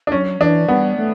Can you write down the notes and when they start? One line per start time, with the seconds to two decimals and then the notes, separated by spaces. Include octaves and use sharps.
0.07 D4
0.12 F#3 C#4
0.40 E3 D4
0.68 G3 B3
0.96 A3